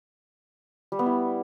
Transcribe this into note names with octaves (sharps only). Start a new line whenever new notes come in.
G3
B3
E4